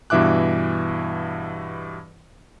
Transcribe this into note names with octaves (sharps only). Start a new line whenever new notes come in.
G2 B2 E3 E5 D6 F#6